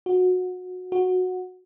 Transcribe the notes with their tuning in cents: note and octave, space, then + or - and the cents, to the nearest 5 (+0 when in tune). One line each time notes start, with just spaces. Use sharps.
F#4 -20
F#4 -10